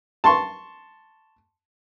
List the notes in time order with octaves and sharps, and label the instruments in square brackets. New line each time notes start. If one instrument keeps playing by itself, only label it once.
[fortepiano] A5 C6 C#6